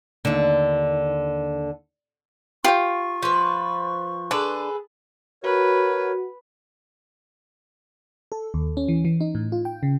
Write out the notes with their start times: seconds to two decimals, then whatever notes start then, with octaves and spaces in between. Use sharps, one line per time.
0.25 D#2 D3
2.64 F4 G4 G5 C#6
3.23 F3 B4
4.31 D3 G#4 A4 B4
5.44 F#4 A#4 B4 C#5
8.32 A4
8.54 D#2
8.77 C#4
8.88 E3
9.05 E3
9.21 D#4
9.35 A2
9.52 F4
9.65 G5
9.83 C#3